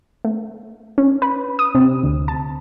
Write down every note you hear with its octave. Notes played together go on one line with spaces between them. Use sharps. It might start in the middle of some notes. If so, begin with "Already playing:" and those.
A3
C#4
B4
D#6
C3
D2
A5